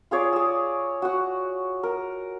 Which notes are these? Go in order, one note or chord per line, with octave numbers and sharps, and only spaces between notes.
F4 G#4 C#5 D5
G#4 E6
F#4 F#5
A#4